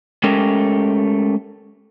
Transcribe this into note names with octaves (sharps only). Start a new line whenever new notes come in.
G#3 A3 C#4 G4 A4 A#4